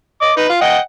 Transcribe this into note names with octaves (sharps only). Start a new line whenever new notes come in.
D#5 D6
D#4 B4
F4
D#5 F#5 G5